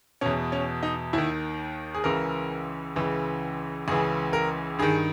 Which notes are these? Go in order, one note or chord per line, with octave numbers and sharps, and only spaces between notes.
E2 B2 C#4
C#4
D#4
D#2 D#3 E4
G#4
C#2 C#3 E3 A#4
C#2 C#3 E3
C#2 C#3 E3 G#4
A#4
G2 D#3 G#4